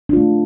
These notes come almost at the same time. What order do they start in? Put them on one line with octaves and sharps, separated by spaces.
D4 F4 A3